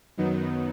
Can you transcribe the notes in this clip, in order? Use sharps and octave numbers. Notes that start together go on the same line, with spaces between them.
F#2 D#3 F#3 B3 D#4